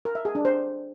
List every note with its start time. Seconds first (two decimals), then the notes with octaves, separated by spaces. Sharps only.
0.05 A#4
0.15 E5
0.25 G#4
0.35 D4
0.45 C5